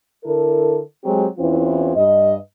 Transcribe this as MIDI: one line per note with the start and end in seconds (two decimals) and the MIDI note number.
0.24 0.78 50
0.24 0.78 64
0.24 0.78 69
0.24 0.78 70
1.03 1.25 54
1.03 1.25 56
1.03 1.25 60
1.03 1.25 67
1.38 1.91 40
1.38 1.91 52
1.38 1.91 60
1.38 1.91 61
1.38 1.91 64
1.38 1.91 65
1.96 2.34 43
1.96 2.34 75